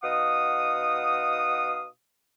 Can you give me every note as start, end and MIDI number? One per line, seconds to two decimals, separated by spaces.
0.03 1.85 47
0.03 1.85 63
0.03 1.85 77
0.03 1.85 78
0.03 1.85 87